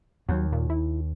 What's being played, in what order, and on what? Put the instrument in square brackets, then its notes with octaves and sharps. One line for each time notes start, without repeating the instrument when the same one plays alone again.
[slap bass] D#2 [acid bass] F#3
[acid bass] A#2
E4